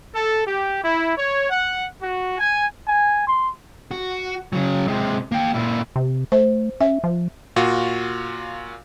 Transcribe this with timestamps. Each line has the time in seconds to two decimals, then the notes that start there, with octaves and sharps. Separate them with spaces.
0.14 A4
0.46 G4
0.83 E4
1.16 C#5
1.50 F#5
2.01 F#4
2.38 G#5
2.87 G#5
3.28 C6
3.91 F#4
4.53 C#3 F#3
4.88 C3 G#3
5.32 A#3 G5
5.54 A#2 E4
5.96 C3
6.32 A3 C5
6.80 C#4 E5
7.04 F3
7.56 A#2 F4 F#4